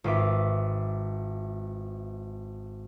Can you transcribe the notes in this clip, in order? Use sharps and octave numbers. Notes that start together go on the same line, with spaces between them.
G#1 F4 B4 E5 D6